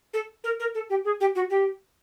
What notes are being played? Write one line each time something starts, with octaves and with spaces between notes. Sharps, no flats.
A4
A#4
A#4
A4
G4
G#4
G4
F#4
G4